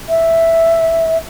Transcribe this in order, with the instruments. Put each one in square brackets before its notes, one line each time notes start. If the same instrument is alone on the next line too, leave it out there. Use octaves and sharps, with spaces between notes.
[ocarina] E5